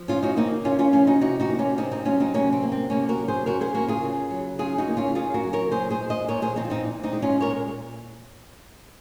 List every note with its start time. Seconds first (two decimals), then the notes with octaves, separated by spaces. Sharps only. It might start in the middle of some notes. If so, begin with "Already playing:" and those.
Already playing: F3
0.08 C#3 C#4 F4
0.22 D#4 F#4
0.36 A#3 C4 D#4
0.64 C#3 C#4 F4
0.79 C#4 F4
0.93 F3 C#4 F4
1.07 D#4 F#4
1.21 C3 D#4 F#4
1.40 D#4 F#4
1.50 A#3
1.59 C#4 F4
1.78 C3 C4 D#4
1.92 C4 D#4
2.05 F#3 C#4 F4
2.20 C4 D#4
2.34 C3 A#3 C#4
2.53 C4
2.62 A#3
2.72 C4
2.90 C3 A#3 C#4
3.09 F#4 A#4
3.18 F#3
3.28 G#4 C5
3.46 C#3 F#4 A#4
3.61 G#4 C5
3.75 A#3 F#4 A#4
3.88 F4 G#4
4.03 C#3
4.31 F#3
4.59 C#3 F4 G#4
4.78 D#4 F#4
4.88 A#3
4.97 C#4 F4
5.15 C#3 F4 G#4
5.34 F#4 A#4
5.43 F#3
5.53 A#4 C#5
5.71 A#2 G#4 C5
5.91 G#4 C5
6.00 G#3
6.10 C5 D#5
6.28 A#2 A#4 C#5
6.42 G#4 C5
6.56 F3 C4 D#4
6.65 F4
6.70 C4 D#4
6.84 A#2
7.03 C4 D#4
7.13 G#3
7.22 C#4 F4
7.40 A#2 A#4 C#5